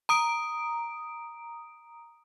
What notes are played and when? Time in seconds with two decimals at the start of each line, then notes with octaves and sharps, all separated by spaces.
0.09 A#5 D#6 D7